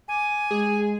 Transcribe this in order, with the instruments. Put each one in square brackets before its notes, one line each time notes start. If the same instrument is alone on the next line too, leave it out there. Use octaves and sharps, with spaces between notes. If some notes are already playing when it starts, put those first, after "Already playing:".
[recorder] G#5 [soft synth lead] D6
[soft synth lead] G#3 [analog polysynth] G#4